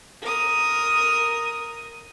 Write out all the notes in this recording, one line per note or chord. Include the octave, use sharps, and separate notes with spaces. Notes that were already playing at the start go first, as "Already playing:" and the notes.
A#4 D#6